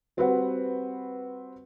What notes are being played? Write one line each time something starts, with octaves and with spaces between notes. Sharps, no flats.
G3 C4 F#4 B4 C5 F#5